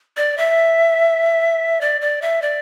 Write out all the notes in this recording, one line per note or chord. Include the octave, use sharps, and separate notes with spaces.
D5
E5
D5
D5
E5
D5